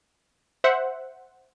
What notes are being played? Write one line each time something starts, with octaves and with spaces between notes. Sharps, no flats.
C5 E5 F#5